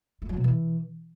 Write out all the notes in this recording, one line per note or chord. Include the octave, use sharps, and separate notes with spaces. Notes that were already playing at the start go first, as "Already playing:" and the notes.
A3
F#3
B2
E3